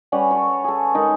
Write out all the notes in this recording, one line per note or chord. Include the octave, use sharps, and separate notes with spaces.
G3 C#4 B4 F#5
A4 C#5
G#4 A4
D#3 G#3 D#4